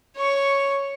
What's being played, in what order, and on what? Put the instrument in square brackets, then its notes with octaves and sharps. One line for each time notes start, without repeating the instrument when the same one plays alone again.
[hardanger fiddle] C#5 C#6